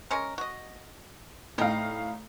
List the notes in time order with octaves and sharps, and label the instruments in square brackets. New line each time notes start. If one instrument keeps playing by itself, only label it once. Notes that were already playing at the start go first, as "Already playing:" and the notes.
[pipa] G#3 C#4 A#4
F#4 D#5
[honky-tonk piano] A2 F5 [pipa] C3 G3 D#4